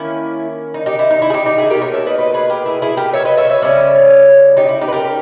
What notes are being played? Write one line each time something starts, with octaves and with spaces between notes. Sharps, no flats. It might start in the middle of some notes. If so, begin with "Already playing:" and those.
Already playing: D#3 A#3 C#4 E4
D#4
D#4 G4
E4
D#4
E4
G#4
D#4 G4
D#4 G4
E4 G#4
B2 A#3 D#4 G4 A#4
A#4 C#5
C#5 E5
B4 D#5
B4 D#5
G#4 B4
G4 A#4
E4 G#4
E4 G#4
G4 A#4
C#5 E5
B4 D#5
C#5 E5
C#5 E5
C#3 G3 A#3 C#4
D#4 G4
E4
D#4 G4
B4
G4 A#4